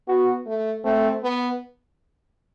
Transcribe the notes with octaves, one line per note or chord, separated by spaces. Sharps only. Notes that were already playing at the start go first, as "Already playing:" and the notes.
B3 F#4
A3
A3 C4
B3